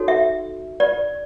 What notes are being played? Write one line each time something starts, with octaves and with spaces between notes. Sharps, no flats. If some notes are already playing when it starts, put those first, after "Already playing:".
Already playing: D#4 F#4 A4 C#5
E5
D5